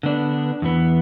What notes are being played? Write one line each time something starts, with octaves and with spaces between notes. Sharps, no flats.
D3 B3 D4
E2 E3 B3